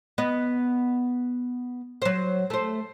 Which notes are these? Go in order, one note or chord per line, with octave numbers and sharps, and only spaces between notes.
B3 D#5
F#3 C5
A3 C5